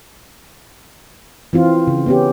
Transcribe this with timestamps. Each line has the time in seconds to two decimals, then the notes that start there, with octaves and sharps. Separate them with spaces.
1.53 E3 C4 F4
1.87 C#3
2.06 B3 C#4 G4